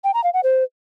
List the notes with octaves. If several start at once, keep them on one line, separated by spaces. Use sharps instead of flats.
G5
A#5
F5
F#5
C5